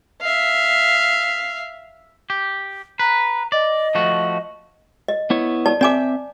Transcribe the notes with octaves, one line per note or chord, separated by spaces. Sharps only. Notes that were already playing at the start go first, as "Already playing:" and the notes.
E5 F5
G4
B4 A#5
D5 D#5
F3 A3 F#4
D#5
B3 E4 C#5
D5 A5
C4 D5 E5 G#5 D6